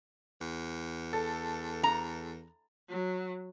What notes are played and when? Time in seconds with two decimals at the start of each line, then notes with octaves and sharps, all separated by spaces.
0.41 E2
1.13 A4
1.83 A#5
2.89 F#3